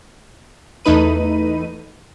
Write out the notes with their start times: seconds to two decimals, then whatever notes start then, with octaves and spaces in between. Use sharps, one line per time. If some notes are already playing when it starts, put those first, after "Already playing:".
0.85 E2 A3 D#4 B4 D#7